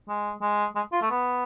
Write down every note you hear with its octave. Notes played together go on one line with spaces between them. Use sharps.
G#3
G#3
G#3
F4
A3
B3